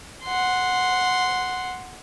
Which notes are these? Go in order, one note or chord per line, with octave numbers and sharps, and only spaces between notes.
F#5 C6